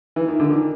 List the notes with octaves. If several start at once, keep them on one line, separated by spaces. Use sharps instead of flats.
E3
D#3
D3
D#3